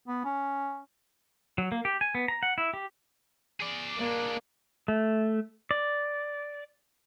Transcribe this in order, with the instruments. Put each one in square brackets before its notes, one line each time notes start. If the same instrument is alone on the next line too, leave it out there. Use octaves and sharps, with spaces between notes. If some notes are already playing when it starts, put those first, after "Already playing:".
[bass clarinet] B3
C#4
[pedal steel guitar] F#3
A#3
G4
G#5
B3
A#5
F#5
E4
G4
[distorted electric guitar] G#4 D5
[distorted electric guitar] G#3 D4 [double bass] A#3
[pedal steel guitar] A3
D5